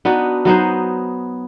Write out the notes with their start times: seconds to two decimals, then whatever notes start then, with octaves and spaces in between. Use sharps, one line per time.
0.05 B3 D4 D#4 F#4
0.45 F#3 B3 D#4 C5